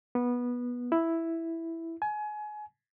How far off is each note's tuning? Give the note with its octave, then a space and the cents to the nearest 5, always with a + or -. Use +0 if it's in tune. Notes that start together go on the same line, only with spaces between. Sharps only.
B3 -15
E4 +0
G#5 +25